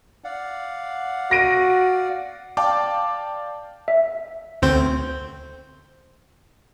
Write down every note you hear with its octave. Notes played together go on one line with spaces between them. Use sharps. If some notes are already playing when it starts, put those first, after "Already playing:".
D5 F5 F#5
F#4 A#6 D7 D#7
D5 F5 G5 A5 D6
E5
D2 C4 C5